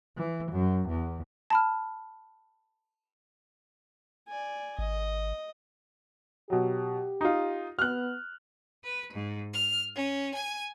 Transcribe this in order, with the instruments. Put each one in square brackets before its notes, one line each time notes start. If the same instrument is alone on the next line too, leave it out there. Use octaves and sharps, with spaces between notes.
[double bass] E3
F#2
E2
[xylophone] A5 B5 F6
[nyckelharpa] D5 G#5
[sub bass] G#1 [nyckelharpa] D#5
[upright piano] B2 F#3 [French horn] G4
[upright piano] D#4 F4
[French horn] B3 [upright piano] F6 F#6
[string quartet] B4
G#2
F6
C#4
G#5